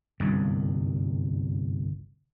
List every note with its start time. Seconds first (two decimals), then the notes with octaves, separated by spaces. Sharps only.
0.20 G1 C2 F#2